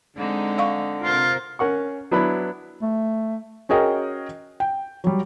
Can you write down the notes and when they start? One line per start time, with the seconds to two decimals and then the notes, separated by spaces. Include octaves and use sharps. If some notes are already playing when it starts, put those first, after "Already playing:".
0.17 D3 G#3 C4 D#4
0.58 D5 F5 C#6
1.03 C3 F4 A#4 C5
1.59 C#4 A#4 F#5 C#6
2.11 F#3 B3 D4 E4 B5
2.82 A3
3.69 C#4 F#4 G#4 A#4 D#5 G5
4.60 G5
5.04 F#3 G3